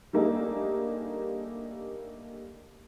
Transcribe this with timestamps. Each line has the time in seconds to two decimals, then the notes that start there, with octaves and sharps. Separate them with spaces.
0.13 G3 A3 A#3 D4 D#4 G#4